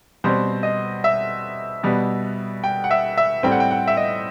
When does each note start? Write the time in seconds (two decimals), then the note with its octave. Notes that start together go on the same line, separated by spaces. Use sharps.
0.24 B2 G3 C4 C5
0.63 D#5
1.04 E5
1.83 B2 G3 B3
2.64 G5
2.84 F#5
2.91 E5
3.17 E5
3.43 A2 G3 C4 G5
3.52 F#5
3.60 G5
3.71 F#5
3.87 E5
3.97 D#5